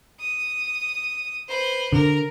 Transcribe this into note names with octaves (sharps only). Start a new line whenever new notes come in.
D#6
B4 C5
D3 A#4